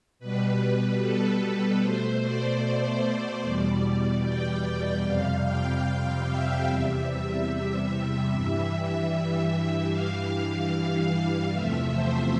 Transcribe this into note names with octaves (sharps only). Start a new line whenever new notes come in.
B2 G3 B4
B4
A4
B4
B2 A3 C5
D5
D5
E2 B2 G3
G5
F2 C3 G3 F5
G5
F5
E5
E2 C3 G3 E5
G2 E3 G3
G2 E3 G3 F5
E2 C3 F3 A3 E5
C5